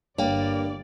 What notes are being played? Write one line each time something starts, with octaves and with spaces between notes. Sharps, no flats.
G1 G2 A#3 C#5 D5 F5 G5